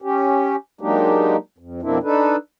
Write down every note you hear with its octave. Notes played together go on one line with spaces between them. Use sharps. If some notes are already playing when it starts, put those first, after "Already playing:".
C#4 G4
F#3 G#3 A#3 D4 D#4 G4
F2
F2 B2 A#3 C4 D4 E4
D4 D#4 A4 B4